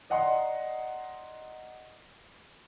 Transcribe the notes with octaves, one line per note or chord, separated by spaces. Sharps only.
D5 D#5 F#5 A#5 C6